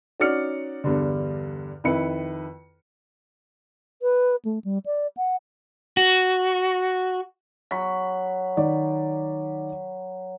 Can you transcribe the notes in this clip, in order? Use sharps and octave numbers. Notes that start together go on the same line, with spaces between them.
C#4 D#4 F#4 D5 F6 C#7
E2 G2 D3
F2 D#3 E4 B4 C#7
B4
A3
G3
D5
F#5
F#4
F#3 B5
D#3 D5